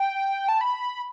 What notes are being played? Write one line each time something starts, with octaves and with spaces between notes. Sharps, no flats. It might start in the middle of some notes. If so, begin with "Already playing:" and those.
Already playing: G5
A5
B5